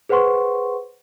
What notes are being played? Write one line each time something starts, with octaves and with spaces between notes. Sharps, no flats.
G#4 B4 C5 F#5 C6 C#6